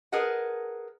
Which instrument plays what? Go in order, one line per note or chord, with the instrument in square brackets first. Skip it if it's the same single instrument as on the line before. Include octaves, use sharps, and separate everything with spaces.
[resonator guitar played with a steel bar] G#4 A#4 B4 D#5 F#5 A5